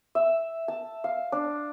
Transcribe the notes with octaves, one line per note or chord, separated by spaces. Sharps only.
E5
A5
F5
D4